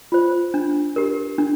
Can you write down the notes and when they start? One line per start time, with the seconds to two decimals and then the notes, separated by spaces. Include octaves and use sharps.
0.12 F4 C5
0.54 D4
0.96 G4 A#4
1.38 D4